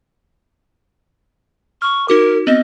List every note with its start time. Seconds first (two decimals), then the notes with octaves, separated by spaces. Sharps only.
1.82 C#6 F6
2.08 D#4 F#4 A#4 D6
2.47 B3 C4 D#5